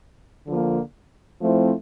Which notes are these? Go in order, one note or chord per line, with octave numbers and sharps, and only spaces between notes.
D3 F3 A#3
F3 A3 C4 E4